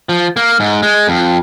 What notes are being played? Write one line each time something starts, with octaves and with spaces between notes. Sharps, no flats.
F3
A#3
G#2
G#3
F2